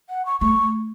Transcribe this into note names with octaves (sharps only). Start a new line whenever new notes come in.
F#5
C#6
A3 C#6